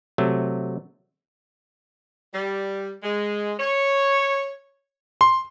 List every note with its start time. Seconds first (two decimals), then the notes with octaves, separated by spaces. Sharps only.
0.18 C3 F#3 A3
2.34 G3
3.04 G#3
3.60 C#5
5.21 C6